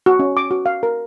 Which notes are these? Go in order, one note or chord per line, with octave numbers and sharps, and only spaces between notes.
F#4
C#4
D6
F#4
F5
A#4